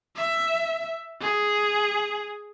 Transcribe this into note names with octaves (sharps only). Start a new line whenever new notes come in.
E5
G#4